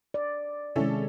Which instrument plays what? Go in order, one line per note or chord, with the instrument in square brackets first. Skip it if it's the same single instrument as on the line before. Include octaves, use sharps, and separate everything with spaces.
[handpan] D5
[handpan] C3 D#3 G#3 [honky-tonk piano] C#4 E4 A4